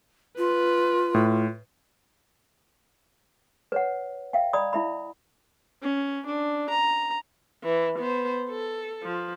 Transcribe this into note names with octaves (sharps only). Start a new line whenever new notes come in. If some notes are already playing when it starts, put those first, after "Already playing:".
F4 B4
A2
B4 C#5 F#5
E5 F5 G5
D5 D#5 A#5 B5 D#6
E4 E5 B5
C#4
D4
A#5
E3
B3 C5
A4
F3